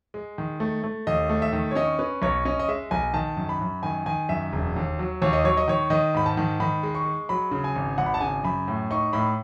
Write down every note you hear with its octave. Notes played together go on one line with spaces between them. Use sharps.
G#3
D#3
A3
A3
D#2 D#5
A3
E5
D#3
C#5
C#4 D#5
C#4 B4
B1 C#5
C#4 D#5
D#5
G#3 E5
B1 G#5
D#3 A5
F#2
B5
F#2
D#3 G#5
D#3 G#5
F#2 E5
E1
D#2
F#3
D#2 C#5
D#5
F#3 C#5
D#5
D#3 C#5
D#3 D#5
G#2 B5
A5
D#3
D#3 B5
G#3
C#6
G#3
F#3 B5
C#3
G#5
G#1
G#1 F#5
B5
A5
C#3 G#5
F#2 B5
A2
D#4 C#6
A2 B5